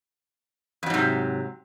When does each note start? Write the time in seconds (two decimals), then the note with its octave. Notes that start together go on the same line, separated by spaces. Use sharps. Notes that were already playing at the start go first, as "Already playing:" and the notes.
0.83 F2
0.86 F#3
0.90 G#2
0.94 C3